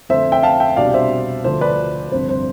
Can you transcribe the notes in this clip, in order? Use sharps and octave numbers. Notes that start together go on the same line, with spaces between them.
F2 D3 A3 C5 E5
E5 G5
F5 A5
E5 G5
C2 B2 G3 D4 D5 F5
C5 E5
D2 D3 F3 A3 C5
B4 D5
G1 F2 C3 C5
C5